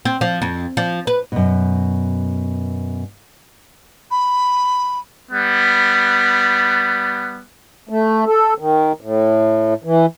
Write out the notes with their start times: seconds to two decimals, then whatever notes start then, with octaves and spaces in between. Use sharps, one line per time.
0.05 C4
0.21 F3
0.42 F2
0.77 F3
1.07 B4
1.32 F#2 B2
4.10 B5
5.32 G3 B3
7.89 A3
8.26 A4
8.58 D#3
9.01 A2
9.84 E3